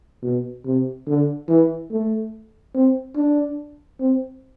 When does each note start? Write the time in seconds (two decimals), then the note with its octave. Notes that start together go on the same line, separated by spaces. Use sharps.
0.23 B2
0.65 C3
1.07 D3
1.49 E3
1.91 A3
2.75 C4
3.16 D4
4.00 C4